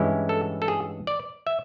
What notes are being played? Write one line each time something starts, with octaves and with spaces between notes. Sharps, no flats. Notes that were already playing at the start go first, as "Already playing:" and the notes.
Already playing: G2 E3 G#3 C#4 E4
A4
A4
G#4
D5
E5